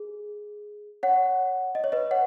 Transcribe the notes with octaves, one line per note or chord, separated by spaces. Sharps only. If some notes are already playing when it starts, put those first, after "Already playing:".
Already playing: G#4
C#5 F#5
D#5
C#5
B4 D#5
C#5 F#5